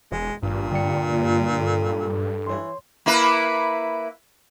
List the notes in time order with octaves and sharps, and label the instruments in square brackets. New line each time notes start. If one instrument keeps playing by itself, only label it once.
[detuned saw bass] E1 [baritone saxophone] G#3
[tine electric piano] G#1 [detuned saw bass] G2 [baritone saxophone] A#2
[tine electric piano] D3 D5 C#7 [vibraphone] G5
[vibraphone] A#3 F4
A4
[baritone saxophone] E3 [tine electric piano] C#5 C6
[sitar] A#3 E4 B4